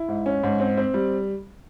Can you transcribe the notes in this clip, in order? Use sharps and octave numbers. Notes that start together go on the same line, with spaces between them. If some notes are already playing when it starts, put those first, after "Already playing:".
Already playing: E4
G#2
C#4
G#2
C4
C4
G3